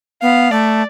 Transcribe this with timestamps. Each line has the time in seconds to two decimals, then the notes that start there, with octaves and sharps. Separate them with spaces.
0.22 B3 F5
0.51 A3 D5